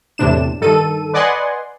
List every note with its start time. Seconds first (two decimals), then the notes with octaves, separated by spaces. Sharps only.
0.18 E2 A2 C3 D4 E7
0.61 G2 D#3 A4 D#7
1.14 B4 D5 D#5 F#5 G#5 C6